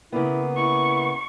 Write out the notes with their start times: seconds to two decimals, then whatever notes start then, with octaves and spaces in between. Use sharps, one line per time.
0.12 C#3 A#3 B3 E4
0.56 E4 C#6